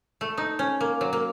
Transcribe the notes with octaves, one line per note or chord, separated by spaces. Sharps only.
A3
D#4
C#4
A#3
F#3
A#3